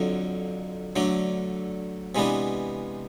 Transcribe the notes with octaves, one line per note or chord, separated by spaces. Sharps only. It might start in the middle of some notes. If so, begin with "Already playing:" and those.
Already playing: F2 D3 F#3
D3 F#3 A3 D4
C3 E3 G#3 B3 D4